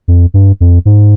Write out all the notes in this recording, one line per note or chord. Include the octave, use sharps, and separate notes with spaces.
F2
G2
F2
G#2